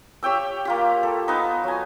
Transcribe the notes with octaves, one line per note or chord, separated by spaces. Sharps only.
G4 C#5 G5 E6
A#3 F4 G4
A4
B3 D#4
F#3 G#5